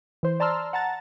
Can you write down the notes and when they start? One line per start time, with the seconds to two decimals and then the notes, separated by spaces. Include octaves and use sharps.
0.23 E3 C5
0.40 D5 A5 A#5 C6 E6 F6
0.73 F#5 A5 A#5 A6